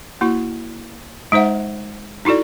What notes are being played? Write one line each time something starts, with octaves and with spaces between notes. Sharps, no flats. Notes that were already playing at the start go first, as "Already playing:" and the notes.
A#3 E4 F#4
G#3 D#4 C5 E5 F#5
D#4 E4 F#4 A4 D5